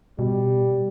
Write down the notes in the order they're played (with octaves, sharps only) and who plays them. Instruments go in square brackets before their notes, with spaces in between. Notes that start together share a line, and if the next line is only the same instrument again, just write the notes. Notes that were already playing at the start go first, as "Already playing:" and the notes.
[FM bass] B2 [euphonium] G3